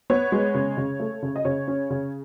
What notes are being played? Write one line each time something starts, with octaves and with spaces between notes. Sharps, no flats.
B3 C#5
G#3
C#3
C#3
A3
C#3
D#5
C#3 C#5
C#4
C#3